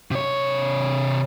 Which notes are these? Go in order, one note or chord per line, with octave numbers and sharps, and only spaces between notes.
C3 C#5